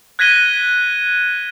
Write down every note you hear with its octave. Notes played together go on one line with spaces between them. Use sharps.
F#6 G#6 A#6 B6 D#7 G7